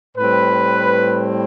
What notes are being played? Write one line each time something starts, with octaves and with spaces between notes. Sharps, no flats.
A2 G3 C4 B4